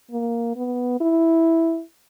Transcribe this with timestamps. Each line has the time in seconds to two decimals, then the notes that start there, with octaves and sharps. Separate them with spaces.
0.11 A#3
0.56 B3
1.01 E4